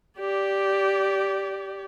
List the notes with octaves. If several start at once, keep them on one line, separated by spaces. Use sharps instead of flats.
G4 D5